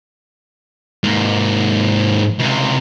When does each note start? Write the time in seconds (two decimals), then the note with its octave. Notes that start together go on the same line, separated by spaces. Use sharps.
1.04 G#2 A#3
2.39 C#2 C3